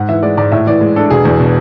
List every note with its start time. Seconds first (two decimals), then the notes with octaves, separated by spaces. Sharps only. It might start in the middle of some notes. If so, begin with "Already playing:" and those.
Already playing: G#2 F#5
0.09 E3 E5
0.23 G#3 D5
0.37 G#2 D5
0.52 A2 E5
0.67 E3 D5
0.81 G#3
0.96 D4 A4
1.10 E1 G#4
1.25 E2
1.40 B2